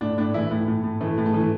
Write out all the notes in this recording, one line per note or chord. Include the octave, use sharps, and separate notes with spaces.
A2 D4
A2 D4
E3 E4
A2
A2
A2
E3 A3
A2
A3
E3